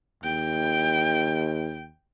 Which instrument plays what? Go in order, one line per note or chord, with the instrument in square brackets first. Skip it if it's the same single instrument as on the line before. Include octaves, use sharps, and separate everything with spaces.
[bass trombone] D#2 [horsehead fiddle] G5